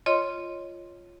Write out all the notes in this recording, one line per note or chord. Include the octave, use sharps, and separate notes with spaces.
F4 C#5 D#5 C6